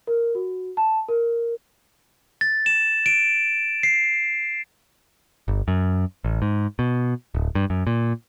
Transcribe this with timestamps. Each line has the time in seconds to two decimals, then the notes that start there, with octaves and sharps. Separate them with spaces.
0.07 A#4
0.35 F#4
0.77 A5
1.09 A#4
2.41 A6
2.66 E7
3.06 D7
3.83 C7
5.48 G1
5.68 F#2
6.24 A1
6.42 G#2
6.79 B2
7.35 D1
7.55 G2
7.70 F#2
7.87 A#2